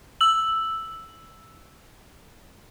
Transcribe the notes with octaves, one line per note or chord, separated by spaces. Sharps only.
E6 F#7